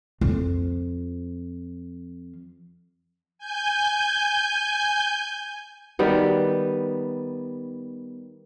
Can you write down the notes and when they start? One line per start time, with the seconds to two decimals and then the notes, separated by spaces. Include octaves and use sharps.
0.21 F2 F3
3.39 G#5 G6
5.99 D#3 G3 B3